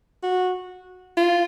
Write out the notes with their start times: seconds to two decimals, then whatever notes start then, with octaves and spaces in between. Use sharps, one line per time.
0.23 F#4
1.17 F4